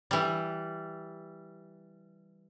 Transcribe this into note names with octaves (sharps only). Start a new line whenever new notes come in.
E3 G3